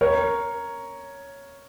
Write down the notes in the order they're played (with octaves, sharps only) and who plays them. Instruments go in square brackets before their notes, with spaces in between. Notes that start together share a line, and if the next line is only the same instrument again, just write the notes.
[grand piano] A#4 C#5